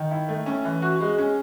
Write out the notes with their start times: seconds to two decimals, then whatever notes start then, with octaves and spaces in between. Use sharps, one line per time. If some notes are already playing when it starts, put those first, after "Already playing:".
Already playing: D#3
0.11 E4
0.29 A3
0.46 C#4
0.65 E3
0.82 F#4
1.00 G#3
1.18 C#4